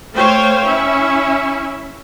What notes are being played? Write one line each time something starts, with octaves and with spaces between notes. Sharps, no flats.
A3 C5 C#5 F5 G5
C#4 E4 E5